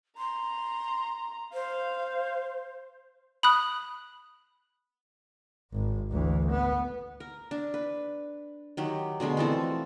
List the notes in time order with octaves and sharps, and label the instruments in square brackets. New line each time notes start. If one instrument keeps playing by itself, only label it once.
[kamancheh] A#5 [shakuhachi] C6
[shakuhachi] C5 [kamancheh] F5
[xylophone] B5 D#6 F#6
[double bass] G#1
D2 E3
B3
[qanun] A#4
D4
B4
D#3 F#3 G4
B2 D3 G#3 A3
E3 F3 C4 A4